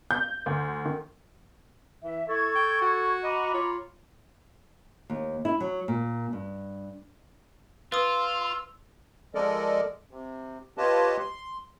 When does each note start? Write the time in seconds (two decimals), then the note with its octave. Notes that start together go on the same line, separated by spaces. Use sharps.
0.11 G6
0.46 D2
0.85 D#3
2.03 E3 E5
2.29 E4 A4 C#6 G#6
2.55 G5
2.82 F#4
3.24 D#5 A#5 B5 D6
3.54 F4 C#5
5.10 D#2
5.45 E4
5.60 F#3
5.88 A#2
6.33 G2
7.92 F4 B4 C6 D#6 E6
9.35 F3 G#3 A4 A#4 D5 D#5
10.11 C3
10.78 F4 G4 B4 C#5 D#5 A5
11.19 C6